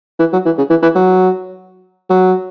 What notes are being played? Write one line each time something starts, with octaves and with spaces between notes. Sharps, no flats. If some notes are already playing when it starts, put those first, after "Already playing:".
E3
F#3
E3
C#3
E3
E3
F#3
F#3